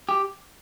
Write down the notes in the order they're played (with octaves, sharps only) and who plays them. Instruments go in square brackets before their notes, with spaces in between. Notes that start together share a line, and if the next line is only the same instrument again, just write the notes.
[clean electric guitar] G4